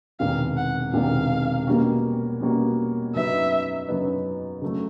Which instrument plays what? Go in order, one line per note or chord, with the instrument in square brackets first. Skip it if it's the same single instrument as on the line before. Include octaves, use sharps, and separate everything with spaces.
[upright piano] E1 E2 C3 D#3 [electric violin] F5
[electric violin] F#5
[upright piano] E1 E2 C3 D#3 [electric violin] F5
[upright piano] B2 G3 A#3 C#4 F#4
B2 G3 A#3 C#4 F#4
[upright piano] F#2 C#3 F#3 B3 D#4 [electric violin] E5
[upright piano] F#2 C#3 F#3 B3 D#4
C#3 F#3 A3